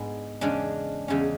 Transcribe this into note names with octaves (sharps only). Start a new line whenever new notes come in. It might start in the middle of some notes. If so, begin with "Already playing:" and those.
Already playing: G#2 G#3 B3 D4
E2 C#3 G#3 C#4 D4
E2 C#3 G#3 C#4